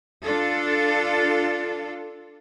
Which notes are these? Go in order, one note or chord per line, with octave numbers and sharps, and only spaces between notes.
D4 F4 A4